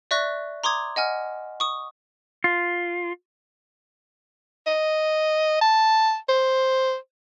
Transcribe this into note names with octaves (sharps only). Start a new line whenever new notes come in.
D5 E5 C#6 F#6 A#6
A#5 C6 D6 D#6 G#6
D#5 F#5 G#5 F6
C#6 D#6
F4
D#5
A5
C5